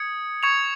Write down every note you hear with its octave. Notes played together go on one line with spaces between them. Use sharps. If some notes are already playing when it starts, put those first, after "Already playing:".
Already playing: D#6 G#6 C#7
C#6 G#6 C#7 F7